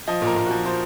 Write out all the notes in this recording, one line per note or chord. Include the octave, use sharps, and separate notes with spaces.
F3 D#5
A#2
A#4
A#2
F3 F#4
F3 C5